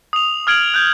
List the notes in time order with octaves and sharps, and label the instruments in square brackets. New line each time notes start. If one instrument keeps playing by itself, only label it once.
[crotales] D#6 F7
D#6 F6 G#6 D7 F#7
F#6 G6